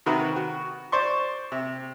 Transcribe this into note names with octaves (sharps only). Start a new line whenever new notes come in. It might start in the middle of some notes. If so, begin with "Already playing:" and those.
C3 D#3 F#4 A#4 B4
F#4
C5 D5 C6 C#6
C3